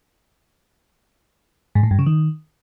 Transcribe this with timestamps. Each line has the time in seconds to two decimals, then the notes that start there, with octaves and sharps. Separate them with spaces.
1.75 G#2
1.83 A2
1.91 G2
1.99 C#3
2.06 D#3